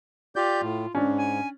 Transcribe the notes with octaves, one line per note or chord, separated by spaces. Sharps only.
F4 G4 D5 G6
A2
G#2 C#4 D4
G#5